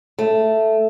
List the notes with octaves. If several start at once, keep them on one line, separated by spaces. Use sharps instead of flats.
A3